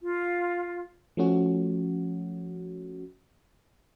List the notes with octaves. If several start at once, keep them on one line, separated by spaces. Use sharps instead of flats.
F4
F3 A3 C#4 F#4